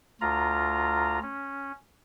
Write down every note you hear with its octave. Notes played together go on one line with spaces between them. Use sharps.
D2 F4 A#5
C#4